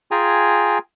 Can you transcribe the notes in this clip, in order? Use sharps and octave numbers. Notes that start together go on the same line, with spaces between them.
F4 G#4 G5 G#5 A#5